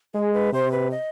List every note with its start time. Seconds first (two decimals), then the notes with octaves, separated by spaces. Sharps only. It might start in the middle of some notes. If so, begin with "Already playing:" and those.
0.14 G#3 G#4
0.33 B4
0.53 C3 C5
0.71 B4
0.91 D#5